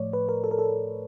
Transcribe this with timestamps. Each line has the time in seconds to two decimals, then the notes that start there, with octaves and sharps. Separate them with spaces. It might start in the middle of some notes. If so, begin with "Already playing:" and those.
Already playing: A2 F3 A3 C#5 D5
0.13 B4
0.29 A#4
0.44 A4
0.51 A#4
0.59 A4